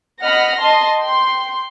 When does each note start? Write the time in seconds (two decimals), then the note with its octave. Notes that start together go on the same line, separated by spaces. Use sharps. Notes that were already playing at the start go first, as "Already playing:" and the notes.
0.23 D#5 F#5 B5 F6 A#6
0.59 D#5 A5 C6
0.98 G5 C6